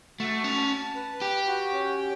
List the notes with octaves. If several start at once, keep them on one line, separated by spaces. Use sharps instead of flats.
A3 F#4
C#4 A5
A5
B4
G4 G5
F#4
C#4
G5